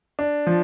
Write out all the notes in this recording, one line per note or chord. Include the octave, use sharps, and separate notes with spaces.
D4
F3